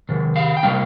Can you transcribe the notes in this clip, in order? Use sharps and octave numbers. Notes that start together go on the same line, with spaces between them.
C3 D#3
F5
G5
C3 G3 D4 F5